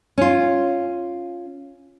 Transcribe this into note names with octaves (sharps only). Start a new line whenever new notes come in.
C#4 F4